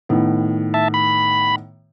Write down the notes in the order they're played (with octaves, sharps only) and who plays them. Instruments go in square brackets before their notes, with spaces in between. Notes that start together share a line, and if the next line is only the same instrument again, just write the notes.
[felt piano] A2 D#3 B3
[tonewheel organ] E5 A5
B5